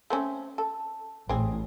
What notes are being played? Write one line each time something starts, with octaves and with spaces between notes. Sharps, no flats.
A3 C4 C#4
A4
A1 A2 C4 G#4